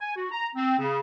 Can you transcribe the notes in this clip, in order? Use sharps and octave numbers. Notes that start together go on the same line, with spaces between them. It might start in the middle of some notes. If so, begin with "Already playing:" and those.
G#5
F#4
A#5
C4
C#3